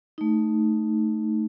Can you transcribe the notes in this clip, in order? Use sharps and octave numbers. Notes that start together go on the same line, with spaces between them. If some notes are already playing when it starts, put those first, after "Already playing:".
A3 D#4